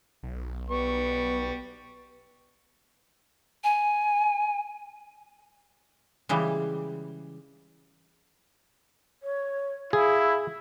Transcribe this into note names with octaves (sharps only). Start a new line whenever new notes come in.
B1
G3 B3 C#6
G#5
C#3 E3 G3 G#3
C#5
E4 G#4 F5